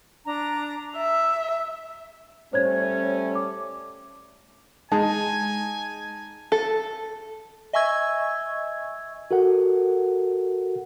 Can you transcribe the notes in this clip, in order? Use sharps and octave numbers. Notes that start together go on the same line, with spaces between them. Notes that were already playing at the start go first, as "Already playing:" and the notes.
D4 A#5
E5
G3 A3 C#4 C5 C#5 G#6
D6
G#3 D#4 G#5 A5
A4
D#5 E5 G#5 C#6 E6 G#6
F#4 A4 A#4 F#5